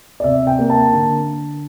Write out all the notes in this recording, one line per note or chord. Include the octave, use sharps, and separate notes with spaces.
D5
C3 E5
G5
A#3
A5
D3